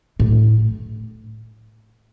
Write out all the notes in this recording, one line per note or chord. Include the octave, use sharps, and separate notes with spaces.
A2